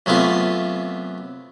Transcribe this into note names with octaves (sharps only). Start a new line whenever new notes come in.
F#2 C3 A3 B3 F4